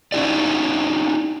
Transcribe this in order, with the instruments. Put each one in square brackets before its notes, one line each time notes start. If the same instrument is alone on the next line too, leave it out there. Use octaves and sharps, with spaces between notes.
[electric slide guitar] C#4 D#4 E4 G4 D5